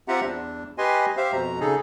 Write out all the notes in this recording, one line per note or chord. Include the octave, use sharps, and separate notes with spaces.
C4 F4 G4 E5 F#5 A#5
E2 D4
G4 B4 D#5 G#5 C6
G4 C5 E5 F5
F2 B2 A#5
C#3 D#4 G#4 A4